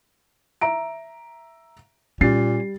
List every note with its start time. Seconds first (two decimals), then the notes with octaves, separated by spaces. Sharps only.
0.61 E5 A#5 D7
2.21 A#2 G3 C#4 A6 C7